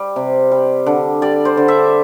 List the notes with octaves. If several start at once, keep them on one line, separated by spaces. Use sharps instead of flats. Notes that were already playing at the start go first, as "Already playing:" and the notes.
Already playing: G3
C3
G3
D3
G3 D5
C5
D3
E5